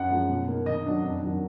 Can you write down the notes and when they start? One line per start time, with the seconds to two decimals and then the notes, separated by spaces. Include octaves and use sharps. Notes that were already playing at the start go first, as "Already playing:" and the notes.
Already playing: F#2 F#5
0.10 F3 G#3
0.29 B2
0.48 A#3 D#4
0.66 D#3 D#5
0.86 F#3 D4
1.04 F2
1.22 D#3 F#3 D4